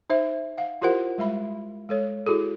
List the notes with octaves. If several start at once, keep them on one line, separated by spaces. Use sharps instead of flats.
D#4 C5 E5
F5 F#5
E4 F4 G4 A#4 C5 F#5
G3 G#3 E5 B5
G#3 A4 C#5
E4 F#4 G#4 A4